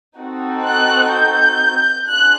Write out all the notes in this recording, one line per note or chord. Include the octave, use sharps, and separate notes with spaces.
C4 D#4 F#4 A4
F#6
G6
D4 F4 G#4 F#6